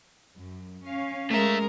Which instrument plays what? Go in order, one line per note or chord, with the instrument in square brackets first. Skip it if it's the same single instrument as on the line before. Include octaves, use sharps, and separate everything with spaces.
[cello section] F#2
C#4 F5
[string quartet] G#3 A#4 [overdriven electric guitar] A3 E5